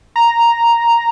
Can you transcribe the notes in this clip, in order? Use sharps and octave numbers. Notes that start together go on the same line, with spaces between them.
A#5